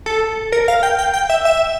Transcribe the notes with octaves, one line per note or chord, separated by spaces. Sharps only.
A4
A#4
F5
G5
G5
G5
E5
E5